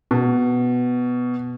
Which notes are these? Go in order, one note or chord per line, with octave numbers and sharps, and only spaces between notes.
B2